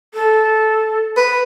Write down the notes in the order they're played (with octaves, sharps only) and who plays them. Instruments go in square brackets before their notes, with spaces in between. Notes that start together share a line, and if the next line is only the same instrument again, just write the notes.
[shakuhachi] A4
[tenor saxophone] B4